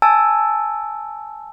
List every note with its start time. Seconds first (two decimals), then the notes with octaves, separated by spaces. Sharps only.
0.02 G#5 A5 E6